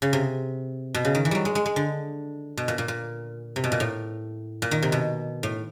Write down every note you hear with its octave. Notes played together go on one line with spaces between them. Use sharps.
C#3
C3
B2
C#3
D#3
E3
F#3 G3
G#3
G#3
G#3
D3
B2
A#2
A#2
A#2
C3
B2
A#2
A2
A#2
D#3
C3
B2
A2